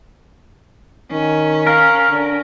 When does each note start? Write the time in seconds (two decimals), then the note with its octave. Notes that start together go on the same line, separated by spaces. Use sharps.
1.12 D#3 C#4
1.67 A#4 F5
2.10 D3